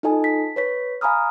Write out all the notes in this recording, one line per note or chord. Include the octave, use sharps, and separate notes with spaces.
D#4 F4 A4 D#5 G#5 A5
B6
B4 C#5 B6
F5 G#5 A#5 B5 D#6 F6